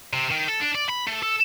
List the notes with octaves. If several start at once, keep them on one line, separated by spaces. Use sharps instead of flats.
C3
D#3
A4
D4
D5
B5
A3
A4